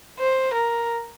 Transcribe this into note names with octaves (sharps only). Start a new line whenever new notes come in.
C5
A#4